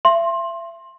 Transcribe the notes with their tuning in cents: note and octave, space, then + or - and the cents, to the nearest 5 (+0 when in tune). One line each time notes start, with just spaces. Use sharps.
E5 +35 C6 +20